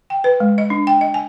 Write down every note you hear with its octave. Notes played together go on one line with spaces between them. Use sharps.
G5
B4
G#3
D#5
D4
G5
D#5
G#5